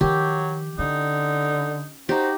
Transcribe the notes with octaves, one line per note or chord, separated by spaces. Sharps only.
D#3 F3 F#3 G4
D3 C#4 D#4
D#4 F#4 G4 C5